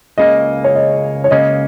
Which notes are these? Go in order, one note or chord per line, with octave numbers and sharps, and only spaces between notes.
C#2 C#3 A#3 D#5
C#5
D#5
C#5
C#2 C#3 A#3 C#4 D#5